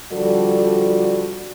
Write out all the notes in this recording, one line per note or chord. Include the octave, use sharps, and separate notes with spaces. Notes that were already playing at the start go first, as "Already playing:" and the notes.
D3 F3 G3 F#4 A4 D5